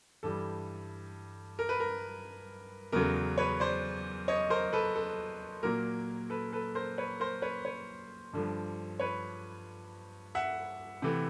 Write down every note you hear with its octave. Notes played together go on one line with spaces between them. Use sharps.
G2 E3 G3 A4
A#4
B4
A#4
E2 C#3 F#3 A3 A#4
B4 C#5
C5 D5
C#5 D#5
A#4 C5
A4 B4
A4
A#2 F#3 A#3 A#4
A4 B4
A4 B4
A#4 C5
B4 C#5
A#4 C5
B4 C#5
B4 C#5
G2 D3 F3
B4 C#5
E5 F#5
C3 E3 A3